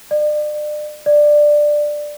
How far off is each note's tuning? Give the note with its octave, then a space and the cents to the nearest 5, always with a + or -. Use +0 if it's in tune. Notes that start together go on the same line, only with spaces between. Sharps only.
D5 +35
D5 +10